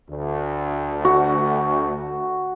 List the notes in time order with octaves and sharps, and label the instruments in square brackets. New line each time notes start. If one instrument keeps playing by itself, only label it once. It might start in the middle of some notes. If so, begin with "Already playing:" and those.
[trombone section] D2
[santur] F#4